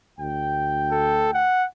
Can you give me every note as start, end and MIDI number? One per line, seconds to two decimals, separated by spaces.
0.19 1.46 38
0.19 1.46 79
0.92 1.32 69
1.34 1.66 78